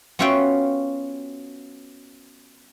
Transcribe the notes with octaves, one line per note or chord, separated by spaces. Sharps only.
B3 C#4 F4 F#4 E5 G5